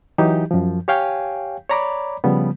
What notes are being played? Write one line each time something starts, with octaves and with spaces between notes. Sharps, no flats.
E3 F#3 D#4 G4
F#2 F3
G4 C#5 F5 G5 G#5
C#5 D5 A#5 B5 D6
C#3 F3 G3 B3